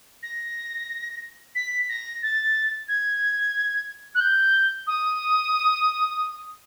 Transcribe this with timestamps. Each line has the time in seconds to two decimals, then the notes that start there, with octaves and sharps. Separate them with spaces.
0.23 A#6
1.55 B6
1.89 A#6
2.23 A6
2.88 G#6
4.15 F#6
4.20 G6
4.87 D#6